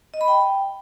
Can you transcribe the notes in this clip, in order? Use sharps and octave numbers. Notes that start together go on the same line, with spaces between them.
D#5
B5
G5